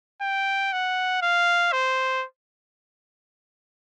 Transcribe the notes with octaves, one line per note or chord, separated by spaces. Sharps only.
G5
F#5
F5
C5